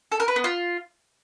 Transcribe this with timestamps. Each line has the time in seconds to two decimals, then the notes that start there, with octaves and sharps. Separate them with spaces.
0.12 A4
0.20 A#4
0.28 B4
0.36 B3
0.44 F4